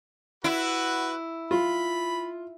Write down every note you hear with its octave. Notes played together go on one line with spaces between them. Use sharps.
E4 F#4 B4
F4 B5